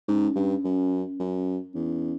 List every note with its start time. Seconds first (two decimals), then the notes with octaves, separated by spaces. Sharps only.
0.08 G#2 C#4
0.36 G2
0.65 F#2
1.20 F#2
1.75 E2 C#4